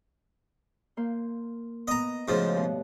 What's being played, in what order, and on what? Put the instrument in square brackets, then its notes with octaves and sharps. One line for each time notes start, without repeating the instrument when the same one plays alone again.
[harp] A#3 C6 G6
[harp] B3 [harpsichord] D#5 A#5
[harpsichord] G#2 F3 [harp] C#3 A3 F#4
[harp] G2 B2